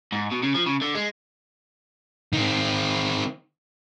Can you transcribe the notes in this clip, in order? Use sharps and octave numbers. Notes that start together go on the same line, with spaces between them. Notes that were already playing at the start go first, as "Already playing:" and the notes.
G#2
B2
C#3
F3
C#3
D3
G#3
D#3 C4